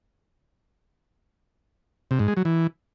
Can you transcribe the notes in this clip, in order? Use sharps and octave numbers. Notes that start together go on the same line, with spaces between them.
C3
G#2
G#3
F#3
E3